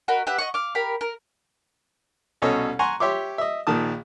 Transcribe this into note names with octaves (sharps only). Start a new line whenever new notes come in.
F#4 A#4 D#5 B5
G4 B4 E5 F#5
D#5 F#5 C#6
F5 D6
G4 A#4 B5
A#4
C2 B2 C#4 A4 C#5 D#5
F#5 G#5 A#5 C6 C#6
G4 C#5 E5 C6 D6
D#5 E5
A#1 A#2 D#3 A5 D#6